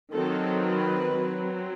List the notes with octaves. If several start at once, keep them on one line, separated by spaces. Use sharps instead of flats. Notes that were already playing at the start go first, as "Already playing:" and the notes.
D#3 F#3 C4 A4
B4
F#3 C4